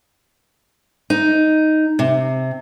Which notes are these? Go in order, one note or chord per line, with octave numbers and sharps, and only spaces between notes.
D#4
C3